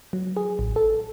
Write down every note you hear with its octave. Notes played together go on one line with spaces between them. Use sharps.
F#3
G#4
A1
A4